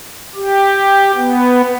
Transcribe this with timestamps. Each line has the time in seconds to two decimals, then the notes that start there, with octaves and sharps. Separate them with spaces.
0.36 G4
1.16 B3